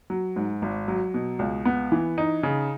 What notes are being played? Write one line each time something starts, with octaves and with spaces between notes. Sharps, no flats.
F#3
G#2
G#1
F#3
B2
C#2
B3
E3
D#4
C#3